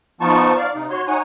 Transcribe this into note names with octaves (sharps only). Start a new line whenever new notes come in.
F3 B3 D#4 F4 A5 C#6
D5 F5
C3 D#4
F#4 C#5 C6
D#4 C#5 F#5 G#5